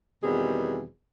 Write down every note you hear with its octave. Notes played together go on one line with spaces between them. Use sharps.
E2 B2 D#3 G3 C4 G#4